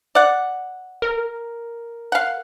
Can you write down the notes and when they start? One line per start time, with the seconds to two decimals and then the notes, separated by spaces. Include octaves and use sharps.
0.15 D5 F#5
1.02 A#4
2.12 F5 F#5